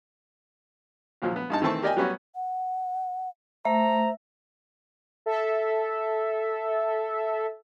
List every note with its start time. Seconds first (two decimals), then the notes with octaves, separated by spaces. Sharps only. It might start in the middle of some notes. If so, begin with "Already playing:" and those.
1.22 D#2 A#2 F3 F#3
1.36 B3
1.50 G2 D#4 A5
1.62 D#3 E3 A3 C4 A5 C#6
1.82 G4 A#4 D5 D#5 G5 G#5
1.96 F#3 G3 B3 C#4 F#4
2.35 F#5
3.65 A3 C5 E5 A#5
5.26 A4 E5